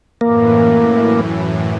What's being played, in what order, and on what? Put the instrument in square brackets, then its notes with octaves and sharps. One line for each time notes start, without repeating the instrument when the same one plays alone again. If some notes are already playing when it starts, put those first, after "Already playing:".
[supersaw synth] F#2 A2 E3 [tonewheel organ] A#3